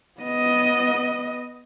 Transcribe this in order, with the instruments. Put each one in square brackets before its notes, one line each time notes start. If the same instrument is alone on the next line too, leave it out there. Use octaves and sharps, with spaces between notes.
[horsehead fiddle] B3 D#5